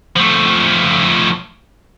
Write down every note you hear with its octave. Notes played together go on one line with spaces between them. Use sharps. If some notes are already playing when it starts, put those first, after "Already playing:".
F3 A3